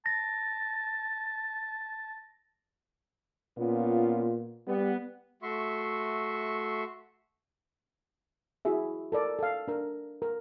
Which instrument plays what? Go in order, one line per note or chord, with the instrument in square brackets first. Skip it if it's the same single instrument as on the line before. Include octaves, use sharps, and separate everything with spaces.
[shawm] A5 [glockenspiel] A#6
[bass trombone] A#2 [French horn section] B3 C#4 F4
[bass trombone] G3 [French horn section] B3
[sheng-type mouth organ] A3 F#4 E5 C6 C#6
[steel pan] E4 F#4 G#4 E5
A4 A#4 D5
A4 F5
D4 A#4
A#4